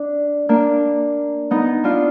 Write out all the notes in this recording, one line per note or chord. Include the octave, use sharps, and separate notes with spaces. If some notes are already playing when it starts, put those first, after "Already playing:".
Already playing: D4
A#3 D4
B3 D#4
D4 F4